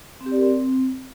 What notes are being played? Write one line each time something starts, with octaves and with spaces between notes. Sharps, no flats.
C4
G4
D5
A#4
C4